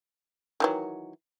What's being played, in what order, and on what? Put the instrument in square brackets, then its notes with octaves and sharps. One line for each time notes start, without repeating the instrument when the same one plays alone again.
[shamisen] D#3 E3 F#3